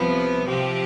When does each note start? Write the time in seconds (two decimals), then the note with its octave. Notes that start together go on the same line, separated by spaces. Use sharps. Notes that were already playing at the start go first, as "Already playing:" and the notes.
Already playing: C2 C3 F3 B3
0.48 C3 F3 C4 G4